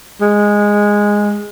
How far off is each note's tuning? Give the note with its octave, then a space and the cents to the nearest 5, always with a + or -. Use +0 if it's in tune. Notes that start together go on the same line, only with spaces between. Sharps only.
G#3 -10